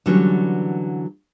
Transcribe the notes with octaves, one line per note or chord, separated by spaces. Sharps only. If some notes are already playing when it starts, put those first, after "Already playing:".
D3 E3 F#3 G3 A3 C#4